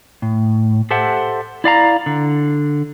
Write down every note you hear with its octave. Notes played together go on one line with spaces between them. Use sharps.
A2
G4 A4 C5 E5 F#5
E4 D5 F5 A#5
D3